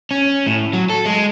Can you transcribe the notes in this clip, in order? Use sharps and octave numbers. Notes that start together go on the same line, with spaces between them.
C#4
A2
F#3
A4
G#3